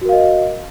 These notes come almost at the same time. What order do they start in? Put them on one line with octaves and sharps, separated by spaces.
F#4 A#4 F5 D#5